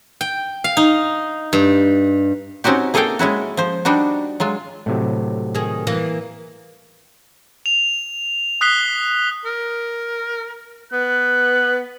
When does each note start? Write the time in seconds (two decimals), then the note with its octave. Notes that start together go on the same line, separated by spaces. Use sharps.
0.21 G5
0.64 F5
0.77 D#4
1.53 G2
2.64 C4 C#4 D#4 F#4 G4
2.94 A#3 G#4 A4 D#5 F5 G5
3.19 G#3 C#4 E4 F#4
3.57 F3 C5
3.85 G3 D4 D#4 F#4
4.40 F#3 G#3 F4
4.86 A2 C3 F#3
5.55 D#3 G#4
5.87 E3 A#3
7.66 F7
8.61 D#6 F#6 B6 C7 G7
9.45 A#4
10.92 B3 F#6